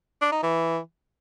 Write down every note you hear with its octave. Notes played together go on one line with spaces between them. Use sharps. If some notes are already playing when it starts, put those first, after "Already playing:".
D4
D#4
E3